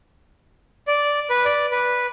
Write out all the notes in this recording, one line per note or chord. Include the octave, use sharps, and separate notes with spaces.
D5
B4
D5
B4